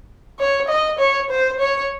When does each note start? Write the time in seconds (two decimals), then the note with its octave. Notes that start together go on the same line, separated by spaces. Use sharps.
0.39 C#5
0.68 D#5
0.99 C#5
1.30 C5
1.60 C#5